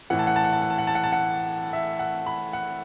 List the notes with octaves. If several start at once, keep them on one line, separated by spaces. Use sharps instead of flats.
A2 E3 F#5
A5
F#5
A5
F#5
A5
F#5
A5
F#5
A5
F#5
A5
F#5
E5
F#5
B5
F#5